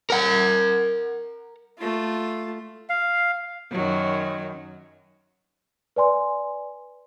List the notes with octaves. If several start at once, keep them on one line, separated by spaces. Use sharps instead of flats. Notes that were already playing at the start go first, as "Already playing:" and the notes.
A#4 F#5
A3 F4
F5
F#2 D#3 F#3
B4 D5 G#5 C6